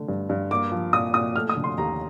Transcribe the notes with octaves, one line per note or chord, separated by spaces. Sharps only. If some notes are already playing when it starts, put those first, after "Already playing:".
Already playing: D3 A3
G2
G2
A#3 D6
F3
A#2 D#6
A#2 D#6
A3 F6
D#6
D3
C6
D#2 A#5